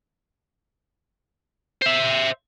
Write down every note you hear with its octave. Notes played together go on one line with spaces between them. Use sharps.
C5 E5